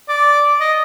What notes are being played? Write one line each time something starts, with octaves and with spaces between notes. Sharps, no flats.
D5
D#5